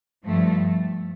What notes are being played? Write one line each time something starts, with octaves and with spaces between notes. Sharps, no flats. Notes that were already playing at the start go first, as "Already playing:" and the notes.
G2 F3 A3